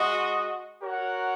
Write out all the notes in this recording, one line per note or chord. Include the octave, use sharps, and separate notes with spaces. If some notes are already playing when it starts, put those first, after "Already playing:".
Already playing: G#3 F#4 D#5
F#4 A#4 C#5 F#5